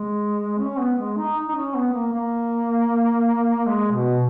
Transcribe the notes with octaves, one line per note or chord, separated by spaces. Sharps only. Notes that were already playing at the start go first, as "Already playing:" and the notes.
Already playing: G#3
C#4
B3
G#3
D#4
D#4
C#4
B3
A#3
A#3
G#3
B2